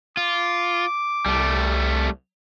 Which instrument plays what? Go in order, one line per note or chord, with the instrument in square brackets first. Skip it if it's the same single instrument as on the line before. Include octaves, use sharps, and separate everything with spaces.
[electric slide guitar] F4 [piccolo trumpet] D6
[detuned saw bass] C2 [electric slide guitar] G3 A3